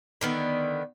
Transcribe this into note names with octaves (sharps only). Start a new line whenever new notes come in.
D3 D#3 B3